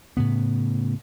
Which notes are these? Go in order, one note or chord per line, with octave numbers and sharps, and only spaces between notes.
A2 C#3 B3